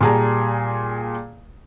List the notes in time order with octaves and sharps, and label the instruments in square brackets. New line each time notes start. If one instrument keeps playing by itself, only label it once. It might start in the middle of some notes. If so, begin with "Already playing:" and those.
[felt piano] A#2 G3 G#4 A5 A#5